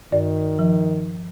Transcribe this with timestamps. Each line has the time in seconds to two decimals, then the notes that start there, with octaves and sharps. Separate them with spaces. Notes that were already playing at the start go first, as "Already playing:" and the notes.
0.12 G2 D#3 D5
0.59 F3